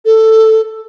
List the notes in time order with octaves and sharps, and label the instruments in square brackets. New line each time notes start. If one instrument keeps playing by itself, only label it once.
[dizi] A4